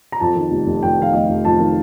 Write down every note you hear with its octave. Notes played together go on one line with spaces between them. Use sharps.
A#5
F2 A5
D#3
F1
F1
F2 G5
D#3 F5
F1 D#5
F1
F2 A5
D#3